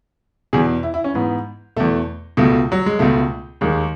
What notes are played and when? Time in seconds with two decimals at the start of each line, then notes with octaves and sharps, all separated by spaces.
0.53 E2 B2 G#4
0.83 E4
0.94 E4
1.04 C#4
1.14 G#2 E3 B3
1.77 E2 B2 A3
2.37 C#2 B2 A3
2.72 F#3
2.86 G#3
2.99 C#2 B2 A3
3.61 D#2 D#3 G#3